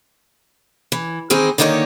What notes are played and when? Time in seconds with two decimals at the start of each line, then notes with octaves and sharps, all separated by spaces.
0.92 E3
1.30 D#3 E3 C4 D#4 G#4
1.58 D3 D#3 A#3 D#4 A#4 C#5